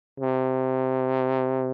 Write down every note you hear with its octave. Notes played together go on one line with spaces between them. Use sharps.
C3